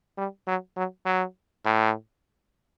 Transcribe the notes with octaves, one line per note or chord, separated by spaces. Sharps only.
G3
F#3
F#3
F#3
A2